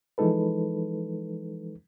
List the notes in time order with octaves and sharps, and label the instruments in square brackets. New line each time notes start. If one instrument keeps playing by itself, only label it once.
[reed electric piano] E3 F3 G#3 D#4 A4 B4